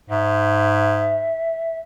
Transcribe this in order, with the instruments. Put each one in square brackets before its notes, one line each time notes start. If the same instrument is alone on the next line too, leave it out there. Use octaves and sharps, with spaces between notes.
[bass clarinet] G#2 [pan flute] E5